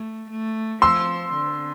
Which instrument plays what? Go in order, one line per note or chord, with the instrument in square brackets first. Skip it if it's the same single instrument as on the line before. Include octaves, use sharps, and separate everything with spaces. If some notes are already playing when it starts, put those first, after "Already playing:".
Already playing: [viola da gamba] A3
A3
[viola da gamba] F3 [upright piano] C6 E6
[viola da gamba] D3